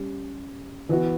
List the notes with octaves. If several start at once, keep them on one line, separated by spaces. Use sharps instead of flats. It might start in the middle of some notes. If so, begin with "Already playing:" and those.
Already playing: G3 C#4 G4
E3 B3 F#4